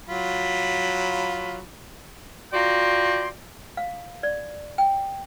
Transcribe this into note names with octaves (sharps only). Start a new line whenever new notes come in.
F#3 F4 B5
F4 F#4 D5 G5 A#5 C6
F5
D5
G5